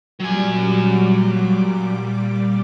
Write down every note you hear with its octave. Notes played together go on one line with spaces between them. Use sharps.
A#2 F#3 G3 G#5 D6